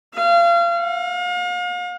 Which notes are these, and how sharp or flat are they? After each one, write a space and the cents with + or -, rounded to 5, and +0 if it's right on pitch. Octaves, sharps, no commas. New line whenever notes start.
F5 -30
F5 +40